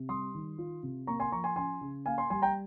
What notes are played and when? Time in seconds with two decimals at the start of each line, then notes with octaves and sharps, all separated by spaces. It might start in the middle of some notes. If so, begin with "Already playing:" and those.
Already playing: C3
0.09 G3 C6 D#6
0.34 D#3
0.58 F4
0.83 C3
1.07 A#3 A#5 C#6
1.20 G#5 C6
1.32 F3 A#5 C#6
1.44 G#5 C6
1.56 C#4 G#5 C6
1.81 C#3
2.06 A#3 F5 G#5
2.18 G#5 C6
2.30 G3 G#5 C6
2.42 G5 A#5